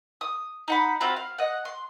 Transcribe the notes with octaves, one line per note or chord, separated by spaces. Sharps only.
D#6
D#4 F#5 B5
C4 F4 F#4 B5
F5
D#5 F#5
C6